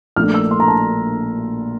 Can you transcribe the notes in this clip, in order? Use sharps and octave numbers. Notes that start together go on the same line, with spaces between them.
A#1 A#2 A3 D4 F6
E6
C6
A#5
A5